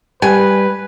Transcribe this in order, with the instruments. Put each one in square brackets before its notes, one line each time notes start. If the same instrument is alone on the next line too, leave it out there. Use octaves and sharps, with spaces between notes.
[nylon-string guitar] G3 [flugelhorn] B4 [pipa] G#5